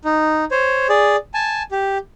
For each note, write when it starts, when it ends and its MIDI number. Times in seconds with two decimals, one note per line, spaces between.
0.04 0.45 63
0.51 0.87 72
0.51 0.87 73
0.89 1.16 68
0.89 1.16 74
1.34 1.63 80
1.34 1.63 81
1.71 1.98 67